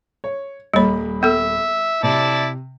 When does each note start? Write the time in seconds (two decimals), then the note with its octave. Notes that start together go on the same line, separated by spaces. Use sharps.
0.24 C#5
0.74 D#1 G3 A#3 C#5 B5
1.23 B3 A4 E5
2.03 C3 E4 D5 A5